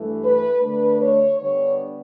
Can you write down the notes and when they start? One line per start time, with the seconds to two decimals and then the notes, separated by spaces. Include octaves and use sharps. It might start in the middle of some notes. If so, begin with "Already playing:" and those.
Already playing: G2 E3 A3
0.22 B4
0.60 D3 A3 D4 B4
0.99 C#5
1.37 D3 G3 B3 D4 C#5